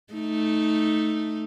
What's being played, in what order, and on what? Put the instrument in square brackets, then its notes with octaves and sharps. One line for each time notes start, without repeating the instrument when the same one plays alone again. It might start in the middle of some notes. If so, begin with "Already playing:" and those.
[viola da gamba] A3 D#4